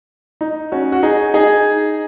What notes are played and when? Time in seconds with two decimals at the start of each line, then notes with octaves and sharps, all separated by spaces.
0.41 D#4
0.72 C#4 F#4
0.92 F#4
1.03 D#4 G#4
1.34 D#4 G#4